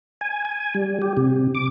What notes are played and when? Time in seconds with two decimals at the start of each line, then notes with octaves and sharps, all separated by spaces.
0.21 G#5
0.45 G#5
0.75 G3
1.02 G4
1.17 C3
1.55 D6